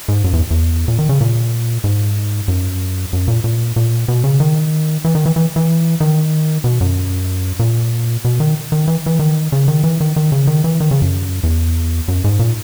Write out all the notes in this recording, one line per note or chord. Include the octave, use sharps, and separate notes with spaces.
G#2
F#2
E2
E2
A#2
D#3
C#3
A#2
G#2
F#2
F#2
A#2
A#2
A#2
B2
C#3
D#3
E3
D#3
E3
E3
E3
D#3
B2
F#2
A#2
B2
D#3
D#3
E3
E3
D#3
C#3
D#3
E3
D#3
D#3
C#3
D#3
E3
D#3
C#3
F#2
E2
F#2
G#2
A#2